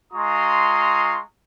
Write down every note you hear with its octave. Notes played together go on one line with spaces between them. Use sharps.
G#3 F4 A#5 C6 C#6 D#6